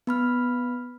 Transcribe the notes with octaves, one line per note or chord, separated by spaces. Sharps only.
B3 B5 F6